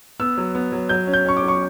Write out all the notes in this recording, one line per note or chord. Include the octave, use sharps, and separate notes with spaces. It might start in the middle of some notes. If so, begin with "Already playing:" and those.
B3 E6
F#3
B3
F#3
F#3 G6
C#4
G6
C#4 C#6
D6
F#3
C#6